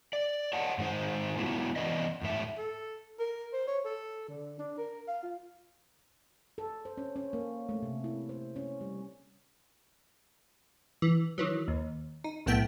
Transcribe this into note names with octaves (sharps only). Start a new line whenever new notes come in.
D5
C#5 D#5 F#5 A5
G#2 D#3 G#3 D#4 C5
D3 F#3 G#3 B3 E4 F4
E3 B3 C#4 B4 D5 D#5
E2 G#2 A3 E5
A4
A#4
C5
C#5
A4
D3
D4
A#4
F5
F4
A4
C5
C#4
C#4
A#3
A3
C3
E4
C5
C#4
G3
E3
D#3 E3 F#3
D#2
D#4
B1 A2 A3 B3 G5